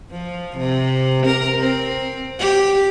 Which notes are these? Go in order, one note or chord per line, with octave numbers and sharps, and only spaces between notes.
F3
C3
A#4
C4
G4